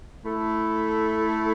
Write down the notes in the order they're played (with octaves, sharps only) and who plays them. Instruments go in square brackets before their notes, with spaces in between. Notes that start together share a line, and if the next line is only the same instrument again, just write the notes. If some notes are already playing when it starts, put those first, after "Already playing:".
[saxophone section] A3 E4 A4